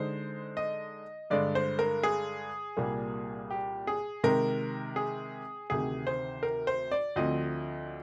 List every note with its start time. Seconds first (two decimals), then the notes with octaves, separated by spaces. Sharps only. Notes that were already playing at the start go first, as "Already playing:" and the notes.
Already playing: D3 G#3 D#4 C5
0.57 D#5
1.30 G2 D3 G#3 D5
1.55 C5
1.79 A#4
2.03 G#4
2.77 C2 A#2 G3 A#3
3.50 G4
3.87 G#4
4.24 C3 D#3 G#3 A#4
4.96 G#4
5.70 D2 C3 D#3 G#4
6.07 C5
6.43 A#4
6.67 C5
6.91 D5
7.16 D2 D3 F3 C4 D#5